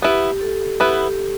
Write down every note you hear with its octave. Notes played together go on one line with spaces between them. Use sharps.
B3 E4 G4 B4
A4
B3 E4 G4 B4